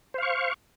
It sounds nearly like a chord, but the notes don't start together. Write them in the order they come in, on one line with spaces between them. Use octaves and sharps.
C5 F5 C#6